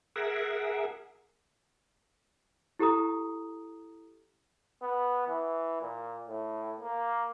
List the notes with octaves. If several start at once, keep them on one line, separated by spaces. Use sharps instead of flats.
G#4 A#4 E5 F#5
E4 G4 A4 A#5 D#6
B3
E3
A#2
A2
A#3